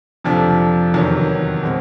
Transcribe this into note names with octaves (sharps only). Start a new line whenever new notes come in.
F2 C3 F3 A3 D4
E2 C3 D#3 F#3
B2 G#3 C4